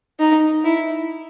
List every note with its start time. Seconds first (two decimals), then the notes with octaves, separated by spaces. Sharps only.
0.20 D#4
0.64 E4